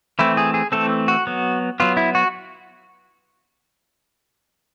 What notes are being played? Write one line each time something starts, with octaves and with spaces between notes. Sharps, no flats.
E3 A3 C4 E4
G#4
G#4
E3 A3 C4 A4
F#4
F#3 B3
F#3 B3 F4
E4
F#4